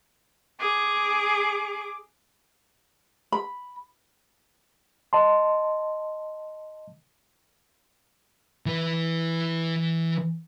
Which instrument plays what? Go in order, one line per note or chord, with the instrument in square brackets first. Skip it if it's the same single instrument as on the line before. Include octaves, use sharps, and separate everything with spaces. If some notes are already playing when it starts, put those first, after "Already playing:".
[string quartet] G#4 D6
[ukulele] B5
[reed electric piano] D#5 A5 C6
[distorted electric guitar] E3 B4